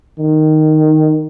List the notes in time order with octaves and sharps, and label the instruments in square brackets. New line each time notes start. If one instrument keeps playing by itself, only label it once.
[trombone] D#3